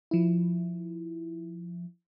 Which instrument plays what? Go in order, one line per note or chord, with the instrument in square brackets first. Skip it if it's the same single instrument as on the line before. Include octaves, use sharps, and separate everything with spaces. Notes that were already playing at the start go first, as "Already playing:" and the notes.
[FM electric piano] F3 E4